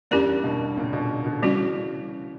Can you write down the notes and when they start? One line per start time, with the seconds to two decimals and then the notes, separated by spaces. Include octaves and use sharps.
0.11 E2 G2 C#4 E4 G4 A#4 D5
0.44 G2 B2
0.77 A#2 C#3
0.93 B2 D3
1.26 B2 D3
1.42 C#3 E3 G3 C#4 F#4